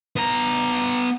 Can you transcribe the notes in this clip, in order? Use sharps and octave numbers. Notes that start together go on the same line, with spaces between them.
B3 A#5